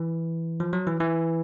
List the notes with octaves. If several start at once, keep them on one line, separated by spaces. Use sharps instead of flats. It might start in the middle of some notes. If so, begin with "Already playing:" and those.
Already playing: E3
F3
F#3
E3
E3